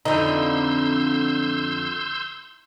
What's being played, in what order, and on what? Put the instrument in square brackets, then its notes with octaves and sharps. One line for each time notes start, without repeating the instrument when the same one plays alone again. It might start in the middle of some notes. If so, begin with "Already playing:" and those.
[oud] F2 D3 [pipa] E3 D#4 [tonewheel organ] C6 E6 G6